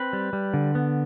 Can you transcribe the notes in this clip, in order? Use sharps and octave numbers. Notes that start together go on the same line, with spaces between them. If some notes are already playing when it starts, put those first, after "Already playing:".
Already playing: C4 B4
G3
G3
D3
B3